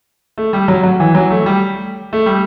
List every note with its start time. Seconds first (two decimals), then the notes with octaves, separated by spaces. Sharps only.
0.38 A3
0.53 G3
0.68 F#3
0.83 F#3
1.00 E3
1.15 F#3
1.31 A3
1.46 G3
2.13 A3
2.26 G3